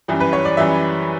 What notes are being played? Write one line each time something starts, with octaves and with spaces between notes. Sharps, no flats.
F#2 E3 G3
B4
C#5
D5
F#2 E3 G3 E5